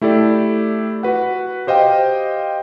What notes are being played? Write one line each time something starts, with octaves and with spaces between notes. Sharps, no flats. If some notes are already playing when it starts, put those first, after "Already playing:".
A3 E4 G4 A4 D5
F#4 B4 F#5
G4 C5 D#5 F5 G5